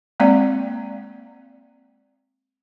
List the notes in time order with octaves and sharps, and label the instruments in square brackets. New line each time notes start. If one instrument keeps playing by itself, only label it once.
[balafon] G#3 A#3 C4 D5 F#5